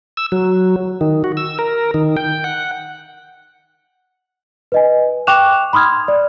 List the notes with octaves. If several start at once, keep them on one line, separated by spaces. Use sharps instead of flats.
E6
F#3
D#3
F#4
E6
A#4
D#3
G5
F#5
B4 D#5 G#5
G5 C#6 D6 F#6 E7 F7
B5 C6 D#6 F6 G#6
D5